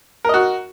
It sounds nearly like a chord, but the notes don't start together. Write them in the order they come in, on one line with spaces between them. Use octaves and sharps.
A#4 D#5 F#4